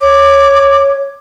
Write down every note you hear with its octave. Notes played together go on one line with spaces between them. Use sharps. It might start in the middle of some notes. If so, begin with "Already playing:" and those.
C#5 D6